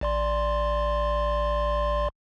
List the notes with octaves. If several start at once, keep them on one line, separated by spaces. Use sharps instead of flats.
A1 D5 C6